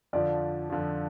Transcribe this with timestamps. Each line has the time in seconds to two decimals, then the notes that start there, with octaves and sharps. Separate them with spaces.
0.13 F2 D3 F3 D5
0.70 F2 D3 F3